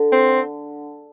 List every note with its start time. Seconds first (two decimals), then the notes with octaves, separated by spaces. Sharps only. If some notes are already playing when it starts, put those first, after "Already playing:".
Already playing: D3 A3
0.12 C4